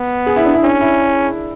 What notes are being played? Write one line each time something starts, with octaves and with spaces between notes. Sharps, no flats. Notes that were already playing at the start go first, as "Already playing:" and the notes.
Already playing: B3
G#4
E4
D4
E4
C#4 D4
E4